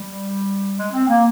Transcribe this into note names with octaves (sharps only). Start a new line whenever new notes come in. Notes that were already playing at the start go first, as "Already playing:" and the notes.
Already playing: G3
G#3
C4
A#3